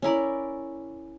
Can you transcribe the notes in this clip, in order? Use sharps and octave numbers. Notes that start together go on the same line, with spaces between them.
C#4 E4 A#4 D5